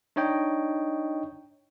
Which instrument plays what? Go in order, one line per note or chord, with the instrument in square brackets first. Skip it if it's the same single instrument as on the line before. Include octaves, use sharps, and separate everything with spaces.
[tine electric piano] D4 D#4 C#5 D#5 G5